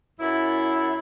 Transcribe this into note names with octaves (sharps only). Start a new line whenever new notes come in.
F#2 E4